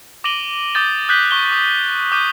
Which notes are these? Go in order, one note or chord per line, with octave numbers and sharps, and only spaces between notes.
D6 A#6 D7 D#7 F#7 G7
D6 D#6 G6 A6 G7
D#6 F#6 G6 B6 F#7 G7
C#6 G7
D#6
D6 D#6 G6 D#7